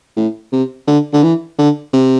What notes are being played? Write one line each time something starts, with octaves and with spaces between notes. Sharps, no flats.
A2
C3
D3
D3
E3
D3
C3